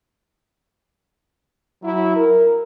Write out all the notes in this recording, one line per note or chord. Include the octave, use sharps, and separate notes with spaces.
F#3 E4
A#4